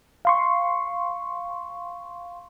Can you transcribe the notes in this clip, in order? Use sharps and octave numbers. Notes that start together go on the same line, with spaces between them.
F5 C6 C#6